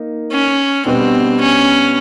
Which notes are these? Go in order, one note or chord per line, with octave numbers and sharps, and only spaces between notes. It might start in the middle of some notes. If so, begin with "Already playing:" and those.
Already playing: A#3 D#4
C#4
B2 G3 B3 C4 D4
C#4